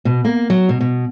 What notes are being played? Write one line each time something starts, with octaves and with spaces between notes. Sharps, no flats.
B2
A#3
F#3
B2
B2